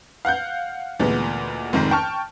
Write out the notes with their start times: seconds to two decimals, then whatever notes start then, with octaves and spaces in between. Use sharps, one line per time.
0.25 F5 F#5 F#6 G6
0.99 D2 A#2 E3 G#3 B3
1.73 F1 F2 G#2 D#3
1.91 G5 A5 C#6 F6